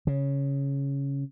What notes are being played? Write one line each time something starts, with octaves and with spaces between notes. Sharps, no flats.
C#3